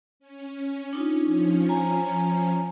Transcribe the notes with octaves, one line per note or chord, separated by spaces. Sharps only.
C#4
D4 D#4 F4
F3 C#4
G#5 A#5